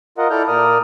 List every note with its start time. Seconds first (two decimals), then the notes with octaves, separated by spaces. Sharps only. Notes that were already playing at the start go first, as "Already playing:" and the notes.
0.18 F4 A#4 D#5 F#5
0.31 E4 A4 D5 F6 G6
0.48 A#2 A#4 D5 D#6 F6